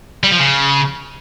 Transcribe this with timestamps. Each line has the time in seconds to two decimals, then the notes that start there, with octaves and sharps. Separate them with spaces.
0.24 G3
0.32 F3
0.39 C#3